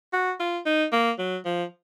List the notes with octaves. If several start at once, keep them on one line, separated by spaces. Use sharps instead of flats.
F#4
F4
D#4
A#3
F#3
F3